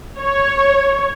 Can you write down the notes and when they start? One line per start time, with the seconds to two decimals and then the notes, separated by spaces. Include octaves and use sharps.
0.21 C#5